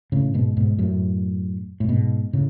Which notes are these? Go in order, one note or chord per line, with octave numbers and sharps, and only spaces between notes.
A2 C#3
G#2 B2
G#2 B2
F#2 A2
A2
G#2 B2
A2 C#3